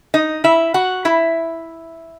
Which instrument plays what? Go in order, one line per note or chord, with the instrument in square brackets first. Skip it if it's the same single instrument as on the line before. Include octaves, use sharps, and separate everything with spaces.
[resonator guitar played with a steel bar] D#4 D#5
E4 E5
F#4 F#5
E4 E5